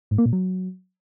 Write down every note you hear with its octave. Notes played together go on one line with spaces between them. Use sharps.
G#2
A#3
A#2
F#3